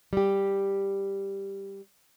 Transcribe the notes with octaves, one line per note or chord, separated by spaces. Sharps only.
G3 G4